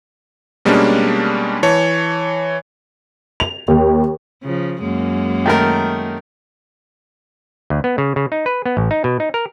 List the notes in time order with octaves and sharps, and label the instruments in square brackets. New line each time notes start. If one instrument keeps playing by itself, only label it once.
[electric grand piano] B2 G3 G#3 A#3 C#4 D4
E3 C#5 A5
[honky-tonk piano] F7
D#2
[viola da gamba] C#3 F3
F#2 G#3 A#3
[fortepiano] D#3 A3 A#4
[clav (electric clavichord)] D2
B3
C#3
C#3
D#4
B4
B3
A1
D#4
B2
D#4
A#4